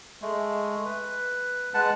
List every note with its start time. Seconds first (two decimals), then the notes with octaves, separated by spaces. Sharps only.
0.22 G#3 A3
0.85 B4
1.74 G#3 B4 F#5 A5